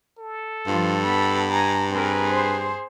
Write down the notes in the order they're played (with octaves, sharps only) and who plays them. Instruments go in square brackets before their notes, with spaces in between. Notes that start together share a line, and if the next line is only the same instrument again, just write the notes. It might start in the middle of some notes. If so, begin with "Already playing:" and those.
[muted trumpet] A4
[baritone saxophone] G2 [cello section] F3 [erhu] F4
[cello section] B3 [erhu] B5
[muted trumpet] G#5 [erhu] A#5
[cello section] C4 A#4 [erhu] G#4 [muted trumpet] B4
[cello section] C5